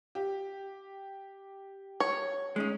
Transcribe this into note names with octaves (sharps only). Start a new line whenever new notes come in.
G4
C#5
G#3 C#4 D#4